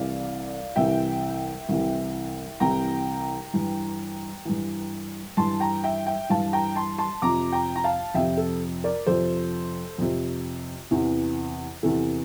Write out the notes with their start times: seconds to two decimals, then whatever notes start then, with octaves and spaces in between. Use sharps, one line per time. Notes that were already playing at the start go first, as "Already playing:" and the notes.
Already playing: C2 C3 E3 D5 F5
0.76 C2 C3 E3 E5 G5
1.69 C2 C3 E3
2.60 C2 C3 E3 G5 A#5
3.54 G2 E3
4.45 G2 E3
5.37 G2 E3 A5 C6
5.60 G5 A#5
5.84 E5 G5
6.06 E5 G5
6.30 G2 E3 F5 A5
6.53 G5 A#5
6.75 A5 C6
6.99 A5 C6
7.22 F2 C3 F3 A#5 D6
7.52 G5 A#5
7.76 A#5
7.84 F5 A5
8.14 F2 C3 F3 E5 G5
8.37 A4
8.84 A#4 D5
9.07 F2 C3 F3 A4 C5
9.98 F2 C3 F3
10.91 E2 C3 E3
11.83 E2 C3 E3 A4